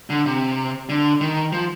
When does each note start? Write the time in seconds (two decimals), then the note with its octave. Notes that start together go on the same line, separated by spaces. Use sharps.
0.10 D3
0.26 C3
0.89 D3
1.21 D#3
1.53 F3